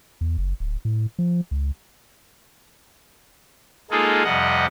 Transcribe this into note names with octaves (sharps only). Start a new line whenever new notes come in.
E2
F#1
D1
A2
F3
C#2
G#3 A#3 D#4 F4 G#4 A4
F2 C3 G3 D#5 F#5